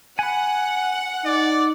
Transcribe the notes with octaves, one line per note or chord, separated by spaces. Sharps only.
F#5 G#5 B5
D#4 D5